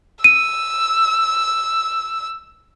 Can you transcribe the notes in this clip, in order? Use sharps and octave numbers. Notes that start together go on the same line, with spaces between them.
E6 D#7